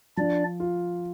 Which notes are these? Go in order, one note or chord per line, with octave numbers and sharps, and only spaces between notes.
F3 D4 D5
F4